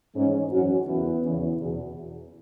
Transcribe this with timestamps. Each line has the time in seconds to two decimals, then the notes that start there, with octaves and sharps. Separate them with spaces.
0.15 G#2 E3 G#3 C#4
0.51 F#2 E3 C#4 F#4
0.86 E2 C#3 E3 B3 E4
1.22 E2 C#3 E3
1.56 E2 B2